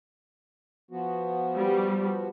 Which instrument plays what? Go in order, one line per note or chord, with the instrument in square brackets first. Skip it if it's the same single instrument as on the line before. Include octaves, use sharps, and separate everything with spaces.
[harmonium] F3 B3 F#4
[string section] G3